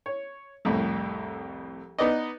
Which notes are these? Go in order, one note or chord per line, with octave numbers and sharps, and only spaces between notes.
C#5
C2 F2 A2
B3 D#4 B4 D5 D#5